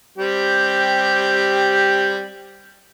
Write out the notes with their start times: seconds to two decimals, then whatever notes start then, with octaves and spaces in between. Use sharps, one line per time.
0.18 G3 C4 G4